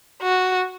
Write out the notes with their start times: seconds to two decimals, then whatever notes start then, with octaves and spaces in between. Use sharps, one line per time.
0.22 F#4